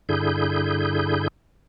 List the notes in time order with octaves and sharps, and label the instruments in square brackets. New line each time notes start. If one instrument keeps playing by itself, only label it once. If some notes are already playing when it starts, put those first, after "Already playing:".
[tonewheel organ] G2 D3 E4 G#4 G6